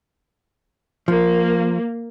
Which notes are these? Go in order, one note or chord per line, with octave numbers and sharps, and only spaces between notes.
F3 A#3